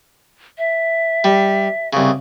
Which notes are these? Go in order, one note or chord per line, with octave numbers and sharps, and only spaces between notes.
E5
G3
C2 C#3